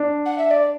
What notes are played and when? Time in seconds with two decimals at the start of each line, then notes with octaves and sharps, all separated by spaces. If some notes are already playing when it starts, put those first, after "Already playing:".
Already playing: D4
0.25 F#5
0.38 E5
0.50 D5